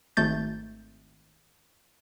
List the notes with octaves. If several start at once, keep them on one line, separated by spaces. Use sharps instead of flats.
G#1 A3 G6 A6